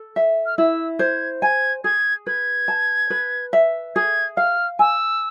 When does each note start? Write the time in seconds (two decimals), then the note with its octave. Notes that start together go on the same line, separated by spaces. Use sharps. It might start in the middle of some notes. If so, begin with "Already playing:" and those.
Already playing: A4
0.16 E5
0.46 F6
0.58 E4 E6
0.99 C5 G#6
1.42 G#5 G#6
1.84 G#4 G#6
2.27 B4 G#6
2.68 A5
3.10 B4
3.53 E5
3.96 G#4 G#6
4.37 F5 F6
4.79 G#5 E6